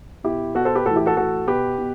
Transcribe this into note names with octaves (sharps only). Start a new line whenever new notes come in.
B2 E4 G4
B2 F#4 A4
A4 C5
G4 B4
A2 E3 F#4 A4
E4 G4
F#4 A4
A2 E3 F#4 A4
B2 G4 B4
B2